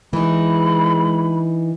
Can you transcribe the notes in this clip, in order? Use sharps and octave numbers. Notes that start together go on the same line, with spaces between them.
E3 G#3 D#4 B5